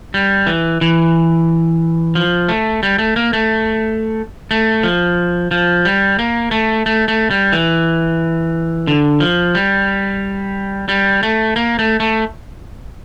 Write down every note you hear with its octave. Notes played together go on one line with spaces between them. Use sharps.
G3
E3
E3
F3
A3
G3
A3
A#3
A3
A3
F3
F3
G3
A#3
A3
A3
A3
G3
E3
D3
F3
G3
G3
A3
A#3
A3
A3